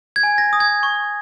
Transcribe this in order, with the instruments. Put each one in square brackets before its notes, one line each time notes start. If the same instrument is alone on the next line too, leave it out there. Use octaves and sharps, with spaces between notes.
[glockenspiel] G#6
G#5
A#6
D#6
G#6
C#6